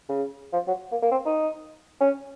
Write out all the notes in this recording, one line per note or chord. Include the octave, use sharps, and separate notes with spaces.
C#3
F3
F#3
A#3
A#3
C4
D#4
C#4